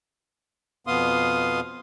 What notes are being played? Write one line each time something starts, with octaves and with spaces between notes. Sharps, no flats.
F2 B2 B3 F5 C6 D#6